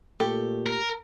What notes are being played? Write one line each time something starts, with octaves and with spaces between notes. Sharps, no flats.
A#2 A3 G4 A4
A#4